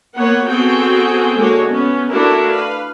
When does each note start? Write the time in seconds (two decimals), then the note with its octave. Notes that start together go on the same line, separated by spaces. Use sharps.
0.17 A#3 B3 C#5 F#5
0.46 B3 C4 F#4 G#4 A4 G5
1.37 D3 G#3 A#3 F#4 C#5
1.69 B3 C#4
2.10 A3 D4 E4 F#4 A#4
2.51 B4 F5